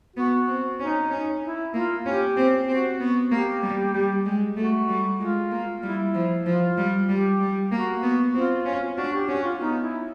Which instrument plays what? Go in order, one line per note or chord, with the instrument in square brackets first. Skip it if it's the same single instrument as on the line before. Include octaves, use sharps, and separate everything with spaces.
[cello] B3 [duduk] F#4
[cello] C4
[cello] C#4 [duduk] D#4
[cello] C#4
[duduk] E4
[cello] A#3 [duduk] F4
[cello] C#4 [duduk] G4
[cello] C4
[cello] C4 [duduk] F#4
[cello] B3
[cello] A#3 [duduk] G4
[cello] G3
G3
G#3
[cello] A3 [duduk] F#4
[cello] G3
[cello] G#3 [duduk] F4
[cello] A#3
[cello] G3 [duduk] E4
[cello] F3
[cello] F3 [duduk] F4
[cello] G3
[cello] G3 [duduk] G4
[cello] G3
[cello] A#3 [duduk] F#4
[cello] B3
[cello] C4 [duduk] F4
[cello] C#4
[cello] D4 [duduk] F#4
[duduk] G4
[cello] C#4 [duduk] F#4
[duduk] F4
[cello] B3 [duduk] D#4
[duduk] E4